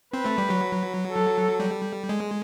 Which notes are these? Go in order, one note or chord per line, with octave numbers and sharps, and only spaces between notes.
C4 B4
A3
G3
F#3
A4
G3
G#3